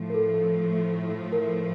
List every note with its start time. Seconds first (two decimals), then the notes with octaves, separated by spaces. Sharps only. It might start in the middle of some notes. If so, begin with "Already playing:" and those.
Already playing: A2 F3 A3
0.10 A#4
0.14 A4
0.34 A4
1.33 A#4